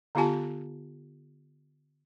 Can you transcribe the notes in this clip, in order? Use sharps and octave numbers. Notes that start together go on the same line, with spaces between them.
D3 B3 F4 G4 G#5 A5